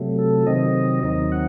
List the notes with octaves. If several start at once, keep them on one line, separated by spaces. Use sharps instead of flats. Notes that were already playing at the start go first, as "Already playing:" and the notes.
Already playing: C3 F#3 A3
A4
C3 D#3 F#3 C4 D#5
D#2 D#3 F#3 C4 D#4 D#5
F#5